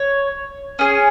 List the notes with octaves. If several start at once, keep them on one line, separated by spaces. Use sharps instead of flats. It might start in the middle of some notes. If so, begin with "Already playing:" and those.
Already playing: C#5
C#4 G#4